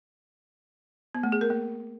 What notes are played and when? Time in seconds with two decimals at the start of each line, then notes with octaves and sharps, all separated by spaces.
1.15 B3
1.23 A3
1.32 G#4
1.41 A#4
1.50 A#3